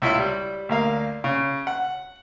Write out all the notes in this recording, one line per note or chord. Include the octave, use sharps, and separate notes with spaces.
C#2 E4 F4 E5
G3
D2 A#3 F5
C#3
F#5